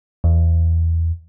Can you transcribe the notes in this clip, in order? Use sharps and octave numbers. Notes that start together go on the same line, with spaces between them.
E2